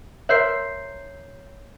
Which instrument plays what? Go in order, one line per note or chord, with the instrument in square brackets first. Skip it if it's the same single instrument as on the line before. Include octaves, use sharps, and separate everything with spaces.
[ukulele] A#4 C5 E5 [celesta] C#5 G6 C7